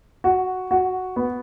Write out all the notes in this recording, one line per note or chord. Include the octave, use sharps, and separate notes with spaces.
F#4
F#4
B3